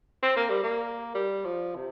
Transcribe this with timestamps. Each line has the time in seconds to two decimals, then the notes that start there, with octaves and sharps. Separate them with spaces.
0.22 C4
0.36 A#3
0.49 G3
0.63 A#3
1.15 G3
1.45 F3
1.75 C3